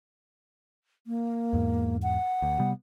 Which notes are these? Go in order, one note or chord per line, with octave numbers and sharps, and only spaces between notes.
A#3
E2 G#2
F#5
D2
C3 G3 B3